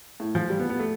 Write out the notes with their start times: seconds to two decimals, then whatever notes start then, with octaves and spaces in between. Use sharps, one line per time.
0.20 A2
0.35 F3
0.50 G3
0.59 B3
0.70 B3
0.80 A3